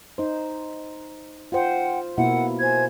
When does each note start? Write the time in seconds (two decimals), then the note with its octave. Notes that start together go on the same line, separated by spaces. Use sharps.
0.18 D#4 C5
1.52 F4 C5 F#5 G5
2.18 B2 A#3 E4 F#5
2.61 C5 G#5 G#6